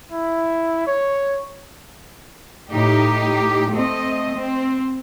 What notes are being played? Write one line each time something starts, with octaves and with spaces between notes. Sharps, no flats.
E4
C#5
A2 D#4 G4
A3 C4 D#5
C4